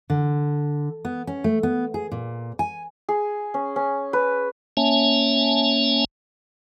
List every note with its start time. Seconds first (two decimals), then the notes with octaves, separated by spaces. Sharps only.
0.10 D3
1.05 B3
1.27 C#4
1.44 A3
1.63 B3
1.94 G#4
2.12 A#2
2.59 G#5
3.09 G#4
3.54 C#4
3.76 C#4
4.13 B4
4.77 A#3 C#4 C#5 E5 G#5 A5